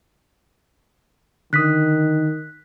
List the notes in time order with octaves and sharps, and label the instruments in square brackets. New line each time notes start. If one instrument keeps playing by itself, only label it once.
[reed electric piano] D3 D#6 [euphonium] D#3 [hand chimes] F#6 B6